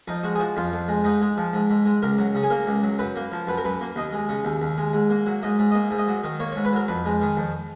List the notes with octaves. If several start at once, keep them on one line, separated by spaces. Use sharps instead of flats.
F2 D#4
G#3 F#4
G#4
F3 F#4
F2 F4
F2
G#3
G#2 D#4
G#3
F3
G#2
G#2
G#3
C#2 A#4
F#3
C#3
G#4
A#3 A#4
C#2
F#3
F#2 B4
A#3
F3
F#2 B4
A#4
F#2 B4
A#3
D#2 D#5
G#3
C#3
D#2
D#2
G#3
G#2
A#3
F#3
G#2 D#5
G#2
A#3 D#5
G#2
D#5
F#3
D#3
A#3 C#5
G#2 C#5
B4
F#3 A#4
F2 B4
G#3
D#3
F2